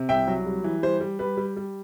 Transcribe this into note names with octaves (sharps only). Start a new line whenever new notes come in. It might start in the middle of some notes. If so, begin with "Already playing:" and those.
Already playing: C3
C2 E5 G5
F#3
G3
E3
G3 C5
G3
G3 B4
G3
G3